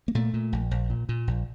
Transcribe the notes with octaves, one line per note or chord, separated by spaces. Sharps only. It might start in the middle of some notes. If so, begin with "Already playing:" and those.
A#3
A#2 A3
A#2
A#1
A#1
A#2
A#2
A#1